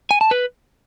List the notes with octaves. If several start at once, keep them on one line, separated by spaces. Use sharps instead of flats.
G#5
A5
B4